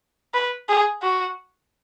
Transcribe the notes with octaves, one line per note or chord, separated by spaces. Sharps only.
B4
G#4
F#4